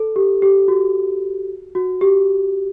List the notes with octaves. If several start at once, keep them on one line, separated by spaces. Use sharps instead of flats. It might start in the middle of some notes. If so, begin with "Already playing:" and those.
Already playing: A4
G4
G4
F#4
F#4
G4